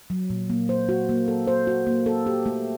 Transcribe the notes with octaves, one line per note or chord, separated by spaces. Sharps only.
F#3
A#2
A#3
C5
F#4
A#3
A4
C5
F#4
A#3
A4
G4
A3